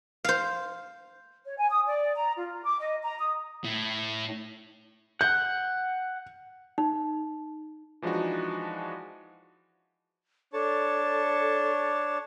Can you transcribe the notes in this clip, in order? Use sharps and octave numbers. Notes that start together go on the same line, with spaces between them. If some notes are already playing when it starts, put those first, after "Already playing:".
C5 F5
C#5
G#5
D#6
D5
A#5
F4
D6
D#5
A#5
D#6
A2
F#5 G6
D#4
E3 F3 G#3 D4 D#4 F#4
D4 A4 C#5 A5